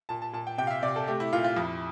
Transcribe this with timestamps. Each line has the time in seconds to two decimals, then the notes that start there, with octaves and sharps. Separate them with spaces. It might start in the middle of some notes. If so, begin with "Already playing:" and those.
0.09 A#2 A5
0.22 A5
0.33 A#2 A5
0.47 G5
0.58 C3 G5
0.67 F5
0.71 E5
0.83 C3 D5
0.96 A4
1.07 A3 G4
1.20 E4
1.33 A#2 F4
1.44 F4
1.56 F2 E4